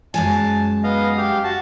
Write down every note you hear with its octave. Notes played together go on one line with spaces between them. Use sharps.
F#2 G#3 G#5 A5
B3 D#5 F5
G4 F5
F#4 A5